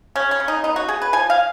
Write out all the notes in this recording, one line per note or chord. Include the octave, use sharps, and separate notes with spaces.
C#3 C#4
C#4
C#3
D#4
B3 D#4
F#4
C#3 G#4
B4
F3 G#5
F5